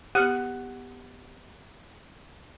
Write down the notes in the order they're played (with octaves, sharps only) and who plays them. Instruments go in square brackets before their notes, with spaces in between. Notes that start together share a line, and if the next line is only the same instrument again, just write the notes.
[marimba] B3 F6 F#6 [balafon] G4 [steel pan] F#5